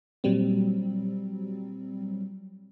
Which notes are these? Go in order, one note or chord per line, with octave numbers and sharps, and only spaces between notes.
A#2 F#3 G3 C4